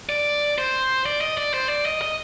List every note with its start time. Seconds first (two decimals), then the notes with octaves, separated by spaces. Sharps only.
0.09 D5
0.58 C5
1.06 D5
1.21 D#5
1.37 D5
1.54 C5
1.69 D5
1.86 D#5
2.01 D#5